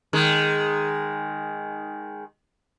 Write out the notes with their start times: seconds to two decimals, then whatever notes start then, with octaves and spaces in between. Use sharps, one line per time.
0.13 D#3 G#3